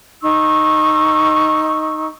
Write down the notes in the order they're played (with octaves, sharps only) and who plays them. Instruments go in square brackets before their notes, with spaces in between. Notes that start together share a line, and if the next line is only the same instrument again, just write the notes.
[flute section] D#4 C#6 E6